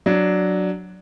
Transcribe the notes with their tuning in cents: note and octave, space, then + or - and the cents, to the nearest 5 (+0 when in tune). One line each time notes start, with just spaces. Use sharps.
F#3 +0 D4 +0